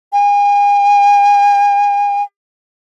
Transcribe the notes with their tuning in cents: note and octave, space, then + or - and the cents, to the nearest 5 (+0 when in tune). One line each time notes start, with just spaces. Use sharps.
G#5 -40